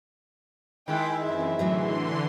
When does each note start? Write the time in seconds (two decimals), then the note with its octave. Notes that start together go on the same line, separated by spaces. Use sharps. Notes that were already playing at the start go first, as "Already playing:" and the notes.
0.88 D#3 G#3 E4 G5
1.23 F#2 E3 C4 E5
1.59 A2 D3 E3 F#3 G#4 C6